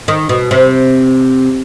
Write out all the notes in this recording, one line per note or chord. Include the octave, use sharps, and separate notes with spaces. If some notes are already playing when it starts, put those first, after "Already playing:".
D#3
B2
C3